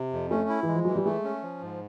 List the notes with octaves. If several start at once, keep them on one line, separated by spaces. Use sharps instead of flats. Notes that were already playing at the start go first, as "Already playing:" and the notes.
Already playing: C3
F2
A3 C#4
E4
E3 G#3
F3
E3 F#3
G3
G#3 A3
C#4
F3
G#2